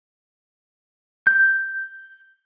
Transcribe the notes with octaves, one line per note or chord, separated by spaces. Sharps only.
G6